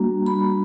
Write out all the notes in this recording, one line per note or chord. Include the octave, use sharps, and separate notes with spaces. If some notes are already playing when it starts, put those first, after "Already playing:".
Already playing: G3 A#3 D4 F#4 A#5
B5